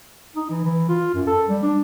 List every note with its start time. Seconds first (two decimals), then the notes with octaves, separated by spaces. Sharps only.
0.36 D#4
0.50 E3
0.65 E3
0.89 F4
1.14 F#2
1.27 A4
1.49 G3
1.63 D4